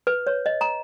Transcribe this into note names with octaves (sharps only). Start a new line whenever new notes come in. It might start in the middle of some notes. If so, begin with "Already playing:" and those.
B4
C#5
D#5
A#5